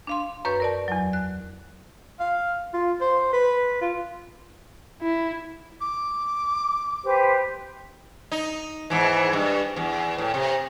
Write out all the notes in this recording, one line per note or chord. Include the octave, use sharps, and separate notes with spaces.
D4 F5 C6
F#2 B4 C#5 C#6 G6
A#4 D5 A5
E2 F#3
F#6
F5
F4
C5
B4
F4
E4
D6
G4 B4 C5
D#4
E2 G#2 E3
G2
E2
A2
C3